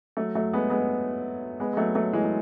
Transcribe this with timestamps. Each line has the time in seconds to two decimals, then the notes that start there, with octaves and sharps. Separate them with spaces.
0.17 F#3 A3
0.35 F#3 A3
0.53 G#3 B3
0.70 G#3 B3
1.60 G#3 B3
1.73 G#3
1.77 F#3 A3
1.95 F#3 A3
2.13 E3 G#3
2.24 F#3